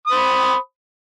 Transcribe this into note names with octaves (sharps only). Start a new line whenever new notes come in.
C5 B5 D#6